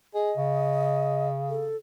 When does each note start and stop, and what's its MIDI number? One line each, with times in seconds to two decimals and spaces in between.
0.15 0.32 68
0.15 1.27 75
0.37 1.75 49
1.50 1.76 69